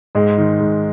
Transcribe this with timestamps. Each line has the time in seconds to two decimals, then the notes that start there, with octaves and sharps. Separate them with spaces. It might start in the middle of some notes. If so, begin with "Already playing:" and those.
0.15 G#2 G#3
0.38 D#3
0.60 G#2